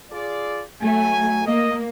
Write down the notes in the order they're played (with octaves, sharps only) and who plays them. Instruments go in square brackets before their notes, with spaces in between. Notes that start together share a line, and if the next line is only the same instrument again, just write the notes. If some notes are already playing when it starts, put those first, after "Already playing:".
[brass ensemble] F4 G#4 D5
[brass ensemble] B1 F#3 G#5 [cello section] A3
[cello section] A#3 [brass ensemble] D#5